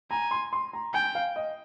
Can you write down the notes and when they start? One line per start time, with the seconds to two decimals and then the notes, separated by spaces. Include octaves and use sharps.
0.11 G#5 A#5
0.31 C6
0.53 C6
0.73 A#5
0.94 G5 G#5
1.15 F5
1.36 D#5